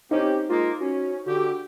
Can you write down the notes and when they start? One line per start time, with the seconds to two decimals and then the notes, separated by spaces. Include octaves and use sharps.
0.11 C4 C#4 D#4 G4 C5 D#5
0.49 G#3 A#3 F4
0.80 C#4 F#4
1.26 D3 F#4 G4